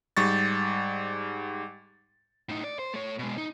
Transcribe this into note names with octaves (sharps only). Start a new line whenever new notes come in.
G#2 G3 C#6 A6
A2 D#4
D5
C5
A3 C#5
B2 G#3
D#4